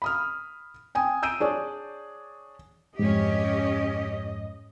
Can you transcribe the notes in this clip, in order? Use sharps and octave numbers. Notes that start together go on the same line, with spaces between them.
B5 D#6 F6
G5 G#5 D#6
E6 G6 D7 D#7
D4 G#4 C#5 D5
F2 G#2 C#4 G4 D#5